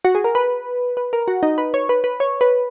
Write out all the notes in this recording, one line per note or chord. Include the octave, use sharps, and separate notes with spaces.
F#4
G#4
A#4
B4
B4
A#4
F#4
D#4
B4
C#5
B4
B4
C#5
B4